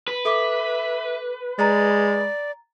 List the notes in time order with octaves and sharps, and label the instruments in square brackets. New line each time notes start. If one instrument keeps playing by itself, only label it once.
[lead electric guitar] B4
[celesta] A4 D6 [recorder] E5
[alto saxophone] G#3 [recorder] D5 [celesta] A#5 A6